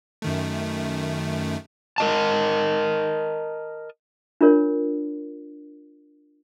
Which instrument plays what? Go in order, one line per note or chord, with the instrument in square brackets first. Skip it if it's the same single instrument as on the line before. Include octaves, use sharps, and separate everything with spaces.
[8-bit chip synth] F#2 D#3 A3
[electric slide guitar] A#4 D#5 A5
[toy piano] D4 F4 A#4 C#5